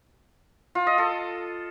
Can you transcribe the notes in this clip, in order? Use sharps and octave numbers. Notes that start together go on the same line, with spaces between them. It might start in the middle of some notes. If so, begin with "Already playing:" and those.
F4
D#5
A4